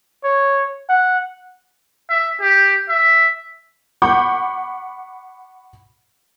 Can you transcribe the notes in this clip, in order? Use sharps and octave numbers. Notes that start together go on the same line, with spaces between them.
C#5
F#5
E5
G4
E5
F#5 B5 C#6 D6 G6